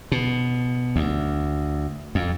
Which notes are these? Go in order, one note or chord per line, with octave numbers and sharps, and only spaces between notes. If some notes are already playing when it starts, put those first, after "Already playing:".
B2
D2
F2